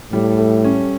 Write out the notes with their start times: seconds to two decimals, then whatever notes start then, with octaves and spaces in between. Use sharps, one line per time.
0.12 A2 G3
0.38 A3
0.64 C#4